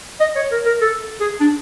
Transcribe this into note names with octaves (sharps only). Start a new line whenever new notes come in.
D#5
C#5
A#4
A#4
A4
G#4
D4